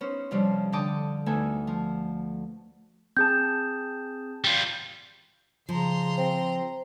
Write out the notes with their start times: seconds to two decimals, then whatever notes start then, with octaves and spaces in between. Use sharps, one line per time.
0.01 B3 C#4 D#4 C5
0.31 F2 C3 F3 G3 C#4 D4
0.72 D3 G5 A5 D6 D#6
1.26 D2 A3 B3 D#4 E5 G#5
1.67 F3
3.17 C4 G#4 A5 G6
4.44 G3 F4
5.69 C#3 F3 A#5 C6
6.18 C4